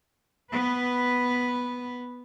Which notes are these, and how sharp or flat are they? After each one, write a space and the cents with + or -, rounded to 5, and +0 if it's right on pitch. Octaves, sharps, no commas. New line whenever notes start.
B3 +0 B4 +0